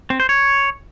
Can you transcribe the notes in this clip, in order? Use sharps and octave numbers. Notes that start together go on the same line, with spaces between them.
C4
C5
C#5